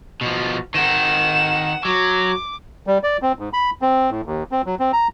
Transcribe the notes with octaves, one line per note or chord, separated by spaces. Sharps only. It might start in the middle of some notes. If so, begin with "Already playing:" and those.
B2 F3
D#3 C4 F#5 E7
F#3 D6
G3
D5
C4
G#2
B5
C4
A2
D#2
C4
F#3
C4
A#5